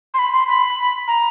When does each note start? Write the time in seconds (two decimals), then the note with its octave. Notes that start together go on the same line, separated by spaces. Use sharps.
0.14 C6
0.19 B5
0.33 C6
0.49 B5
1.08 A#5